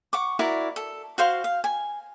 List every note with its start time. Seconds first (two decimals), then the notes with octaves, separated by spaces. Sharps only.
0.13 F#5 C#6 D6
0.39 E4 F#4 A#4 D5
0.76 A4
1.18 F#4 C5 F5 C6
1.44 F5
1.64 G#5